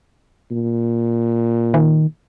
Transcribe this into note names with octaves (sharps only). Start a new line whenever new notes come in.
A#2
D#3